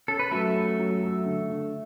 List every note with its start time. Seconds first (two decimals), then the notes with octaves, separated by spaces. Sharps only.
0.08 C#4 A4
0.19 B4
0.31 F#3 A3 A4
0.55 C#4
0.79 F#3
1.03 F#3
1.26 D3
1.50 D3